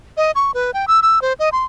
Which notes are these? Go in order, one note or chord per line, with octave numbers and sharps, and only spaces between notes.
D#5
C#6
B4
G5
E6
E6
C5
D#5
C6